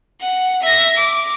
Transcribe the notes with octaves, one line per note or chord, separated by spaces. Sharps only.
F#5
E5 A#6
D6